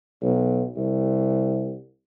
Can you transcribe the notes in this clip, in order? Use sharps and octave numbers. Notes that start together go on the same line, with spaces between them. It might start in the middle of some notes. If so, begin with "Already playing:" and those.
B1
C2